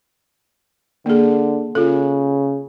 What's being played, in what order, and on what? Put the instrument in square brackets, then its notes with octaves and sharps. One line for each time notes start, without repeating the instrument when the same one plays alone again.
[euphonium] D3 [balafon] A#3 G#4
[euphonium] C#3 [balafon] F4 A4